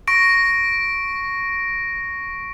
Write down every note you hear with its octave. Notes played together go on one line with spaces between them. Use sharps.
C#6 A#6 D7